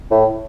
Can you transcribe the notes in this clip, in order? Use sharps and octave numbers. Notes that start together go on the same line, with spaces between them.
A2